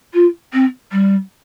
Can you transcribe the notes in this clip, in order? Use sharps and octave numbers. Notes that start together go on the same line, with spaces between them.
F4
C4
G3